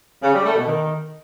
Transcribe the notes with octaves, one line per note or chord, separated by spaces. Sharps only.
C#3
G3
A3
B2
D#3